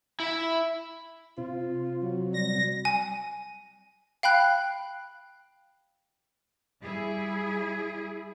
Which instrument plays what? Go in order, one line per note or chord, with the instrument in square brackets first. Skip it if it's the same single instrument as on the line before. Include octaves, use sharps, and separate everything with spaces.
[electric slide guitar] E4 E5
[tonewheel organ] C3 C4 [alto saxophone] F4
[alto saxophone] F#3
[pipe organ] G3 [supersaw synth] A#6
[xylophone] G#5
F5 G5 B5 F#6
[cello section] G3 E4 G#4